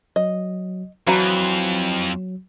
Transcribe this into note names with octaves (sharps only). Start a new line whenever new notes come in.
F#3 D#5
F2 E3 F#3 F#4 A#5